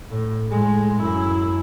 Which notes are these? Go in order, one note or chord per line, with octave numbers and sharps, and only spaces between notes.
A2
A2 G#3
F#2 E4